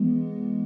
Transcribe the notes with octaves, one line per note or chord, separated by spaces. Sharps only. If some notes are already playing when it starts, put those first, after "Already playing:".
Already playing: E3 G#3 B3